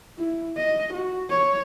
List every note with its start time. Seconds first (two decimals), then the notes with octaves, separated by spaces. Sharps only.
0.18 E4
0.57 D#5
0.93 F#4
1.30 C#5